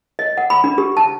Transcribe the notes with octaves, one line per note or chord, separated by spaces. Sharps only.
D#5
F#5
B5
D4
G4
A5